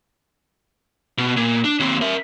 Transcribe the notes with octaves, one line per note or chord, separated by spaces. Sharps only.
B2
A#2
D4
D#2 C4
A#4 E5